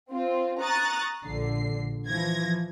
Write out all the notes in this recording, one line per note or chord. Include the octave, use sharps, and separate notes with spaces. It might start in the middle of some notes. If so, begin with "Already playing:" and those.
C4 F4
A#5 C#6 D#6 F#6 A6
A#1 D3 C7
E3 F3 G#6 A#6